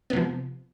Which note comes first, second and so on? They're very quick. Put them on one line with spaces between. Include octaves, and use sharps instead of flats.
B3 C3 F3